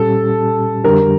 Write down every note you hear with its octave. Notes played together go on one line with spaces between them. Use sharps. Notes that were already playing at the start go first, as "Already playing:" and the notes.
Already playing: A#2 G3 C#4 G4 A4
F2 D3 G3 D4 G4 A#4